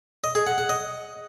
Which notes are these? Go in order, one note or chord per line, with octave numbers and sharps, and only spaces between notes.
D#5
G#4
F#5
F#5
D#5